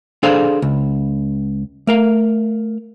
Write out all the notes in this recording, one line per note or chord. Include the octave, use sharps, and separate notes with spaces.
D4 G#4 A4 C5 D5 F5
C#2
A3 A#4 F5